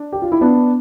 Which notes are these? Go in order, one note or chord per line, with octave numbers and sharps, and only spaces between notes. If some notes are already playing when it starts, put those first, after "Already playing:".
Already playing: D4
G4
F4
E4
B3 D4